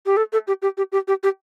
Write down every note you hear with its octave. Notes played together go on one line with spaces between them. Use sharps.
G4
A4
A4
G4
G4
G4
G4
G4
G4